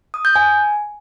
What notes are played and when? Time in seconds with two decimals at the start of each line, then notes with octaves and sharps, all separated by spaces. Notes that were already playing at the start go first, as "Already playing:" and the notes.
0.14 D#6
0.25 G6
0.36 G#5